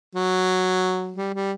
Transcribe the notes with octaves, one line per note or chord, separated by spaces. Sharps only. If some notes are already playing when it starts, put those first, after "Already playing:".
F#3
G3
G3